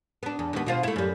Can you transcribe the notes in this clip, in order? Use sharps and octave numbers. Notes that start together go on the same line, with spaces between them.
B3 D4
E2
D#2 B3
B2 F4 C5
A3 E4
F#2 G3